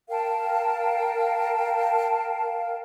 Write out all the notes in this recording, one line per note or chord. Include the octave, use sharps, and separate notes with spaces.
A#4 F5 G5 A5